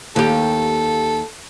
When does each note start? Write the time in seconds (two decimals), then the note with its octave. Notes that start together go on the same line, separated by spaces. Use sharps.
0.16 D#2 G4 A4